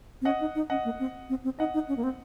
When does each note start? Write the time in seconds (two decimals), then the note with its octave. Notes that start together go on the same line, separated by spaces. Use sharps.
0.22 C4
0.25 C#4 D#5 F#5
0.41 D#4
0.55 D#4
0.70 C#4 D#5 F#5
0.85 A#3
1.00 C4
1.29 C4
1.44 C4
1.59 D#4 D#5 F#5
1.74 D#4
1.89 C#4
1.97 A#3
2.03 C4